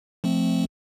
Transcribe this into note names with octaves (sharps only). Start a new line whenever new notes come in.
F3 A3 C4